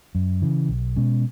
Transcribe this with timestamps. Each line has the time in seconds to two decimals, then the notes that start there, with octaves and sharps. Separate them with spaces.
0.15 F#2
0.42 C#3 E3
0.69 B1
0.96 B2 G#3 C#4